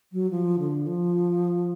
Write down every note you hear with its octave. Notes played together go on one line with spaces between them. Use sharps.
F#3
F3
D3
F3